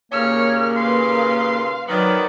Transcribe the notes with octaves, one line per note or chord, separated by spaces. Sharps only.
D#2 A#2 C#3 A#3 C#5 F6
B4 F5 C6
D#3 F#3 B3 D5